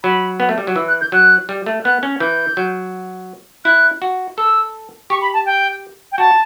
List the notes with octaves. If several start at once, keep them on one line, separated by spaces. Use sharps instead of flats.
F#3 B5
B3
A3
G3
F#3
E3 E6
F#6
G6
F#3 F#6
G3
A3
B3 F#6
C#4
E3 G6
F#3
E4 F#6
F#4
A4 E6
G4 C#6
B5
A5
G5
G5
F#4 A5